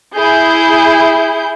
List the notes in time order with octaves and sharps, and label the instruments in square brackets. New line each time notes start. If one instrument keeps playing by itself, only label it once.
[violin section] E4 G#4 G6